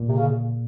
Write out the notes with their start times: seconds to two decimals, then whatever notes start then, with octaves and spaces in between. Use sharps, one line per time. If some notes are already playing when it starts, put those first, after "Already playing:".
Already playing: A#2
0.08 C3
0.17 C#3